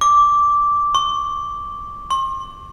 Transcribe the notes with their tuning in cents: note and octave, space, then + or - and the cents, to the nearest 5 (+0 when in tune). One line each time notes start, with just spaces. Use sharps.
D6 -10
C#6 -20
C6 +40